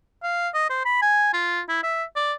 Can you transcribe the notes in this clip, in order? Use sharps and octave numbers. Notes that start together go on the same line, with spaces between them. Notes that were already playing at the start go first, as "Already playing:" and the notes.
F5
D#5
C5
B5
G#5
F4
E4
E5
D5